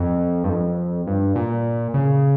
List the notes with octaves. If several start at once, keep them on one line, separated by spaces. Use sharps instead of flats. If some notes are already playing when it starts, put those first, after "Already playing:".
Already playing: F2
G2
F2
G2
A#2
C#3